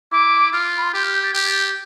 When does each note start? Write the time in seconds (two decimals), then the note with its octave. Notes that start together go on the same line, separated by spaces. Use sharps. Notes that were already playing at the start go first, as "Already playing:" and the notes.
0.12 E4 D6
0.53 F4 F6
0.77 B5
0.83 C6
0.93 G4 G6
1.04 F6
1.13 G6
1.24 A6
1.34 G4 G6
1.47 A6
1.62 G6